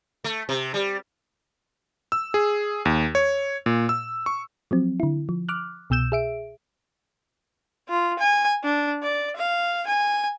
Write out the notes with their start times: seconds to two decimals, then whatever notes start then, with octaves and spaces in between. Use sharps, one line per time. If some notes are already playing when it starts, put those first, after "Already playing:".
0.24 A3
0.49 C3
0.74 G3
2.12 E6
2.34 G#4
2.85 D#2
3.15 C#5
3.66 A#2
3.89 E6
4.26 C#6
4.71 F3 F#3 C4
5.00 D3 E4
5.29 F3
5.49 D6 F6 F#6
5.90 C2 B2 E6 G6 E7
6.12 G#4 E5 D7
7.89 F4
8.19 G#5
8.63 D4
9.03 D5
9.36 F5
9.87 G#5